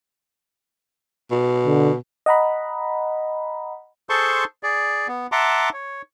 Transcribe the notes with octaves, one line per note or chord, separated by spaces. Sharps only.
B2
D3
D#5 F#5 A#5 B5
G#4 A4 C5 A5 C6 C#6
G#4 D5
B3
E5 F#5 A5 A#5 C6 D6
C#5